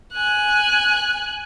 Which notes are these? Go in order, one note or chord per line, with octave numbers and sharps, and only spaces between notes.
G#5 F#6